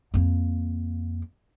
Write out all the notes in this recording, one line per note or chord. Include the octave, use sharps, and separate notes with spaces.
F2 A#3